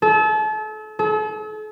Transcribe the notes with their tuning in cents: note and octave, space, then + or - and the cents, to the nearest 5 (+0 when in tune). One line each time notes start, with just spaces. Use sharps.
A4 -35
A4 -45